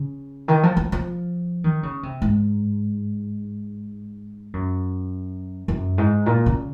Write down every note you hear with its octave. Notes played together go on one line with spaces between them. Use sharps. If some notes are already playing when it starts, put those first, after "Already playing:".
Already playing: C#3
D#3
F3
F3
F3
D#3
C#3
C3
G#2
F#2
F#2
G#2
A#2
C#3